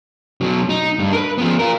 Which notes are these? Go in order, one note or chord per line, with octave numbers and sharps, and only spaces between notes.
B2 F#3
D#4
G2
A#4 B4
F3 B3
F4 A#4